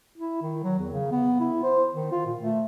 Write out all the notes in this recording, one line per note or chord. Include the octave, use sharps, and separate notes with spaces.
E4
D#3
F#3
E2
C#3
B3
E4
C5
D#3
F4
A#2
A3